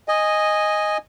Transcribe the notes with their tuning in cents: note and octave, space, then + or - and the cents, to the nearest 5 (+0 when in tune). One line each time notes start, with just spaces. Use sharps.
D#5 +0 G#5 -10